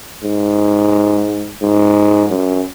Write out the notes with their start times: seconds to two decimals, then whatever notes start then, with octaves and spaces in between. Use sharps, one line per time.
0.24 G#2
1.62 G#2
2.30 F#2